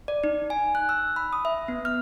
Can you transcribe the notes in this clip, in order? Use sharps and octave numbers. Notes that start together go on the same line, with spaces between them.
D5
D#4
G#5
F#6
E6
B5
D#6
E5
B3
F6